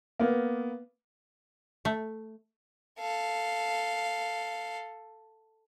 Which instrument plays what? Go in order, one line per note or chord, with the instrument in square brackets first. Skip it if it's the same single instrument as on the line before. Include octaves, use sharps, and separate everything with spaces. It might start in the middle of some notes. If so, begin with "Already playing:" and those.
[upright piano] A#3 B3
[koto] A3
[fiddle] A4 F5